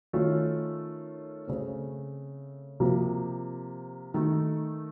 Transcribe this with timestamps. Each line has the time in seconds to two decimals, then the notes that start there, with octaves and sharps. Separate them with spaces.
0.13 D#3 A3 C#4 F4
1.47 C#3 A3 C4
2.80 C3 F3 A#3
4.14 D#3 A3 D#4